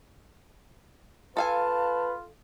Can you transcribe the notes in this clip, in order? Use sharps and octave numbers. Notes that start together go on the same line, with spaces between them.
F4 A4 B4 F5 G#5 A5